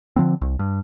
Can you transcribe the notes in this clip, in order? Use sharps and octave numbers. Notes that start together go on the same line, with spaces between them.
D3 F3 B3 C4
C2
G2